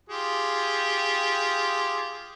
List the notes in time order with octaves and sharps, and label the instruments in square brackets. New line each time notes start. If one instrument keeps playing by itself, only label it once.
[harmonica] F4 G4 G#4